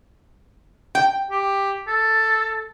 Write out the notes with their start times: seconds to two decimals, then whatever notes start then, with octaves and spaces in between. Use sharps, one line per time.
0.95 G5
1.31 G4
1.87 A4